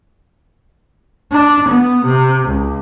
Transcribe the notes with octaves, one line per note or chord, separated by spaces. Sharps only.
D4
B3
C3
C#2